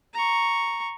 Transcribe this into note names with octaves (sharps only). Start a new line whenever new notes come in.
A#5 C#6